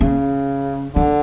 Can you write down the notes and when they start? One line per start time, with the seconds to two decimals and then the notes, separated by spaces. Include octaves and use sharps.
0.01 C#3 C#4
0.95 D3 D4